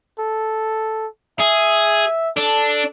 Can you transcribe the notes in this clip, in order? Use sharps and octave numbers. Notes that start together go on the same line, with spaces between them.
A4
G#4 E5
D4 A4